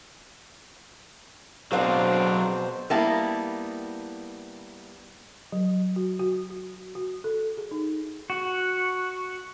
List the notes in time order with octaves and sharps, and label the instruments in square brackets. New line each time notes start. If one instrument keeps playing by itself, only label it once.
[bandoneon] B2 C5 [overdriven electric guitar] F#3 C4 [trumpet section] D4 [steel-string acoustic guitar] G#4 F5 F#5
[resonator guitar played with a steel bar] G3 A#3 B3 E4 A5
[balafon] F#3
F#4
F#4
F#4
F#4
A4
G#4
D#4
[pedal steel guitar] F#4